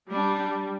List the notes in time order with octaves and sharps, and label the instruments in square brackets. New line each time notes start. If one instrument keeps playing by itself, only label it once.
[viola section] G3 [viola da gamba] D4